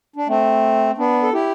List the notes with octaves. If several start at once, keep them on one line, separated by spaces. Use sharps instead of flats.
D4
A3 C4
B3 D4
A4
E4 G4